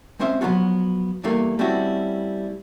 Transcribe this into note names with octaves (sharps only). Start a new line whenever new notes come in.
G#3 C4 C#4 C5 E5
F3 F#3 B3 D4 F4 F#4
E2 E3 G3 A3 A#3
G3 A3 C4 C#4 E4 F#4